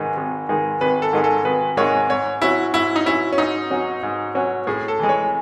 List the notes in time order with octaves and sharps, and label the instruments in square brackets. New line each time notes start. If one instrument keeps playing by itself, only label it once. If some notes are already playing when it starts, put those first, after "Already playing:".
Already playing: [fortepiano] G#1 G#2 D#3 G#3 D#4
G#1
G#2 D#3 G#3 D#4
[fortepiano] G#1 [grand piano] B4
[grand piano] A4
[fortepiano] G#2 D#3 G#3 D#4
[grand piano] A4
[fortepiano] G#1 [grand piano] B4
[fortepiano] G#2 D#3 G#3 D#4 [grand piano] C#5
[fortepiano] G#2 [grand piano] C#5
[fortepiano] F#3 C#4 F#4 [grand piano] E4
[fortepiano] G#2 [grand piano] E4
[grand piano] D#4
[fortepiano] F#3 C#4 F#4 [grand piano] E4
[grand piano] C#4
[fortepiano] G#2 [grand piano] D#4
[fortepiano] F#3 C#4 F#4
G#2
F#3 C#4 F#4
[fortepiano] A2 [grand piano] G#4
[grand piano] A4
[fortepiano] E3 G#3
[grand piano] C#5